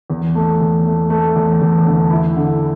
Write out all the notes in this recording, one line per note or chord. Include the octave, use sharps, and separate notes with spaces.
E2
A3
E2
A3
A3
E2
E2
D3
E4
D3